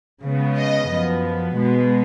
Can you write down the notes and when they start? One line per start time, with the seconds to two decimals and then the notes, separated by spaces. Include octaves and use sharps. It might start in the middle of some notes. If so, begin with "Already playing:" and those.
0.24 C#3 G#3 B3
0.57 D#5
0.90 F#2 F3 B3
1.56 B2 G#3 B3